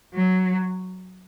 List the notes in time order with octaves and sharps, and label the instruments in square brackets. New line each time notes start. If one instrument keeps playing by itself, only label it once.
[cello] F#3